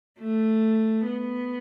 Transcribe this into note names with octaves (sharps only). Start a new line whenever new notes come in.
A3
B3